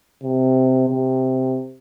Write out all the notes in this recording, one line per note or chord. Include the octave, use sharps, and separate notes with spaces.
C3
C3